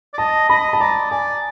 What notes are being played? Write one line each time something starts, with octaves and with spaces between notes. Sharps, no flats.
D5
D#5 A5
D#5 B5
A5
D5 A#5
D5 G#5